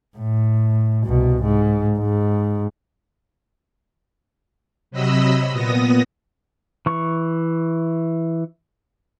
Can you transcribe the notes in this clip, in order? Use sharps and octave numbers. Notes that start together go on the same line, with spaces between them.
A2
C2 B2
G#2
G#2
C3 F#3 D#5 B5 E6
A#2 B3 D#6 A#6
E3 C#6